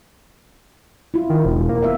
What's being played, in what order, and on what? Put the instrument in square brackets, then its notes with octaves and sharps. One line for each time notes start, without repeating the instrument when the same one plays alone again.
[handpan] E4 F4
[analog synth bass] D#3
E1
A#3
[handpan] B3 E5 F5